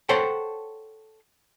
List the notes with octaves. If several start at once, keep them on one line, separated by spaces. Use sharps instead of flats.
A4 C5 C#5 F#5 G5